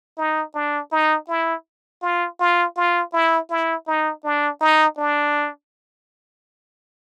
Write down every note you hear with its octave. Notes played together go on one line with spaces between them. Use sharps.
D#4
D4
D#4
E4
F4
F4
F4
E4
E4
D#4
D4
D#4
D4